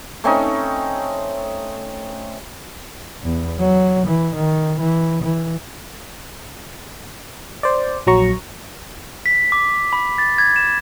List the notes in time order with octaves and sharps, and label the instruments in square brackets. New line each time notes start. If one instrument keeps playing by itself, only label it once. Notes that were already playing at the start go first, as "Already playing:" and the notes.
[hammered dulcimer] A3 C4 C#4 D#4
[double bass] E2
F#3
E3
D#3
E3
E3
[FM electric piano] C5 D5
A#1 F#3 A#5 C#6
[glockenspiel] B6
D6
B5
A6
G#6
E7